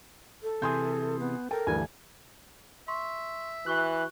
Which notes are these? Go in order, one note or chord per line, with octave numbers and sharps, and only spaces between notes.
A4
C3 E3 G#4 G#5 C6 G6
B3
A4 A#4 G5
D2 G2 E3 G#5
E5 C6 C#6
E3 F#4 C#6 F#6 G7